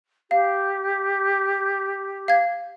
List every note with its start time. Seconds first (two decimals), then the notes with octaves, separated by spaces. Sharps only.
0.31 G4 F5
2.28 F5 G#6